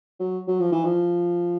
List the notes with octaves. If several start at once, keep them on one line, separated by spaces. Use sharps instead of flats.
F#3
F#3
F3
E3
F3